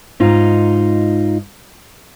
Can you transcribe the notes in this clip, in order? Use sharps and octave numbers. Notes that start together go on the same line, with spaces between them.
G#2 D#4 F4